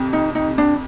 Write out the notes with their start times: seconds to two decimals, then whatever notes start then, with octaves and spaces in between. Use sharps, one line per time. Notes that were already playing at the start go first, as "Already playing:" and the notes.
Already playing: F2 C3
0.13 D#4
0.35 D#4
0.58 D4